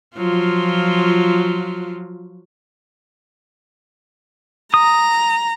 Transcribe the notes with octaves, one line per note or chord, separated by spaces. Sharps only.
F3 F#3 F4
A#5 D#6